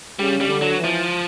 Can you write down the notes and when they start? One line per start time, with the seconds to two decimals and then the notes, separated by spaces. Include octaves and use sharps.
0.19 C#3 G3
0.41 G3
0.48 D3
0.62 F#3
0.77 E3
0.84 F3